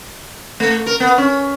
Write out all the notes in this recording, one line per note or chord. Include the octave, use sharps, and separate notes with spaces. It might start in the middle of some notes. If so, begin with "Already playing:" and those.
A3
A#4
B3
C#4